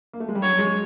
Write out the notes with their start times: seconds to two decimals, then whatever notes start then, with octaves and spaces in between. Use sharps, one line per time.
0.13 A#3
0.20 A3
0.29 G#3
0.35 G3
0.43 F#3 C#5
0.59 G#3